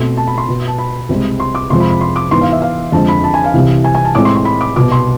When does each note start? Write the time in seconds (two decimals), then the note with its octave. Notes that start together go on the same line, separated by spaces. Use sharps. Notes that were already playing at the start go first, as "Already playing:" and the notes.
Already playing: B2 A3 C4 C6
0.17 A5
0.27 B5
0.38 C6
0.48 B2 B3
0.67 A5
0.79 B5
1.09 C2 C3 G#3 C4
1.40 C6
1.55 D6
1.70 F2 C3 F3 G#3 C6
1.80 B5
1.90 B5
2.01 C6
2.16 D6
2.31 G#2 E3 B3 C6
2.41 F5
2.52 E5
2.62 F5
2.92 F2 D3 G#3 A5
3.08 B5
3.24 A5
3.34 G#5
3.44 F5
3.54 C2 C3 E3
3.84 G#5
3.95 G#5
4.05 A5
4.15 A2 G#3 C4 D6
4.25 C6
4.36 C6
4.45 B5
4.61 D6
4.76 C2 B2 B3 D6
4.92 C6